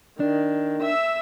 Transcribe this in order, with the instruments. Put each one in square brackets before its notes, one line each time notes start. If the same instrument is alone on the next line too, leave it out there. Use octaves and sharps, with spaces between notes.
[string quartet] D#3 [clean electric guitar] D4
[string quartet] E5 E6